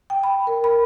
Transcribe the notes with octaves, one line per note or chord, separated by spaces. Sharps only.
G5
B5
A#4
B5